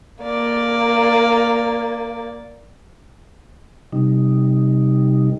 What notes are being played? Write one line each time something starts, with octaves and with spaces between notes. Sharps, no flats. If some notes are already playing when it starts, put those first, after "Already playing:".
A#3 D5
C3 G3 D#4